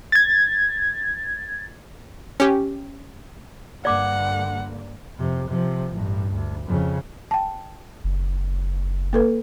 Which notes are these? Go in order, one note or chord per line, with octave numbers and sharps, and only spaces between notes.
G#6 A6
C#4 G4
G2 D3 A#3 D5 F#5 D6
F2 C3
C3 F3
A1 G2
D2
F2 C#3
G5 A5
F#1
A#3 A4 B4